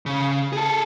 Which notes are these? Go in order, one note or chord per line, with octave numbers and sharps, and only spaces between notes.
C#3
G#4 A4